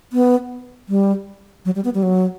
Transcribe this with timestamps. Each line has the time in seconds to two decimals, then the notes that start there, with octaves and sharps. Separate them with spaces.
0.13 B3
0.89 G3
1.65 F#3
1.75 G3
1.84 B3
1.94 G3
2.03 F#3